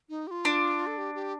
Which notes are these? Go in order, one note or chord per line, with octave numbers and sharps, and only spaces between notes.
D#4
G4
F4
D4
A4
G4
G4